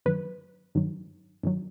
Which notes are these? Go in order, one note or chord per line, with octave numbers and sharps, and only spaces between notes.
G2 D#3 F#3 B4
G2 D#3 F#3
G2 D#3 F#3